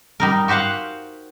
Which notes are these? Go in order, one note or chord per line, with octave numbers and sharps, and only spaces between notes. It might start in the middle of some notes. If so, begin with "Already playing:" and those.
G3 D#4 A#4
F#4 G4 C5 F5 F#5